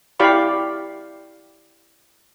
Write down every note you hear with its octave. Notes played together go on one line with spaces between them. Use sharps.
E4 G4 D5 F5 B5 C#6